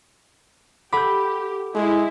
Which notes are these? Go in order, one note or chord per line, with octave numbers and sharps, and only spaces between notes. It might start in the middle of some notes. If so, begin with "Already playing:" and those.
G4 A4 F#5 B5 D6 G6
G#3 E4